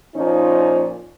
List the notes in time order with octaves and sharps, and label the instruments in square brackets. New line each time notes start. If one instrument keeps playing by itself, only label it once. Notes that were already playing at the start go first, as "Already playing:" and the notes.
[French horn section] A#2 F3 C#4 D#4